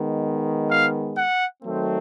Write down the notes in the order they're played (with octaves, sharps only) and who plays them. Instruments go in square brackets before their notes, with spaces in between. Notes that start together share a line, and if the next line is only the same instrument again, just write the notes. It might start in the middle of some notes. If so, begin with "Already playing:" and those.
Already playing: [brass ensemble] D#3 G#3 B3
F5
F#5
D#3 F#3 A3 C4